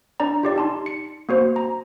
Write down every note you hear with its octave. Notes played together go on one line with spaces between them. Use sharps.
D4 D5 A#5
F4 G4 D5
D#4 A5 C6
C#7
A#3 F#4 C5
A#5